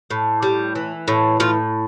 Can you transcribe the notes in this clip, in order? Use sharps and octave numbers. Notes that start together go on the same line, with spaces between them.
A2
G3
E3
A2
A2 F4